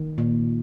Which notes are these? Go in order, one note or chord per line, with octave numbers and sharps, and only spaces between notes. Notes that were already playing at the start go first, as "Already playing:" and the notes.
Already playing: D#3
A#2